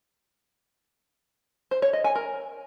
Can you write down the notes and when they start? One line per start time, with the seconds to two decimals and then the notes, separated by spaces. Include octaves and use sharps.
1.71 C5
1.82 C#5
1.93 D#5
2.04 G#5
2.15 A#4